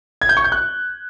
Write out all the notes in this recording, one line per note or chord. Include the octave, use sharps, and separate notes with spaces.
G#6
G6
C#6
G6
F#6